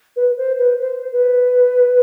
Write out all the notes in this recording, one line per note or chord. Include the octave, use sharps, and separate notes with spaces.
B4
C5
B4
C5
B4